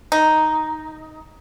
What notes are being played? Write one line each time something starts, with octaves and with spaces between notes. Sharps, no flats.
D#4